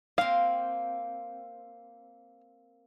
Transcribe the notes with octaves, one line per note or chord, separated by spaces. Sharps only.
A#3 C4 F5